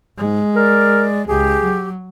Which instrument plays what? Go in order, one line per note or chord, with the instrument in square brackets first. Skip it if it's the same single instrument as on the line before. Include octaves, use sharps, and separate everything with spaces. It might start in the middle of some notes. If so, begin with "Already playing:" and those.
[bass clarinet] G#2 [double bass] G#3
[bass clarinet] A#4 [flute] D5
[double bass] C#2 [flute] G4 [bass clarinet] G#4
[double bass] F#3